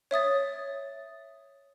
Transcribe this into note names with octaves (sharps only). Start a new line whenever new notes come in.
C#5 E5 D#6 A6